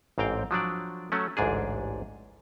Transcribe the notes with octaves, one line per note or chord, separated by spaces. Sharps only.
A1 G#2 C4 F5 G5
F3 F#3 D4 D5
F#3 A3 C#4
A1 D2 G#2 D4 G#4